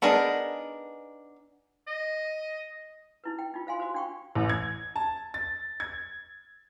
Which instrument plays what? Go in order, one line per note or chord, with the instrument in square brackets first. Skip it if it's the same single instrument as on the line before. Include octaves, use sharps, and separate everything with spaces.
[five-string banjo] B3 D4 D#4 G#4 A#4
[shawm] D#5
[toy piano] D#4 E4 B4
G5
D#4 F4
C5 F5 G#5 C6
F#4 C5
D4 G5 C#6
[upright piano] A1
G#6
A5
A6
G#6